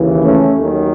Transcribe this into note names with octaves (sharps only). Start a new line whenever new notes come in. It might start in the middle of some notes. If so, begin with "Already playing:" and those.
Already playing: D#2 C#3 E3
A3 C#4
D#2 D#3 F#3